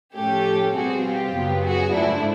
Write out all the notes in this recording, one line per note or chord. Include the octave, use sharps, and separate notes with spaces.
A2 F3 A3 C#4 G4 A4
B2 G3 C4 F#4 G#4
F4 G4
F#2 C#3 F#3 B3
F#4 G#4
G#2 F3 A3 D4 E4